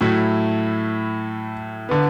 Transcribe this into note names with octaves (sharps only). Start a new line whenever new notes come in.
A2 F#3 A3 E4
D3 B3